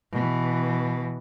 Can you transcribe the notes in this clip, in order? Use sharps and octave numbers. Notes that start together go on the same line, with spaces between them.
B2 E3